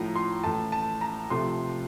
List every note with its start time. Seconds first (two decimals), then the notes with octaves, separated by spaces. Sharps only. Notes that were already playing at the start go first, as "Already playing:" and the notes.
Already playing: A2 F3 A3 A#5
0.16 C6
0.44 A2 E3 A3 A5
0.72 A5
1.01 A#5
1.30 C3 F3 A3 C6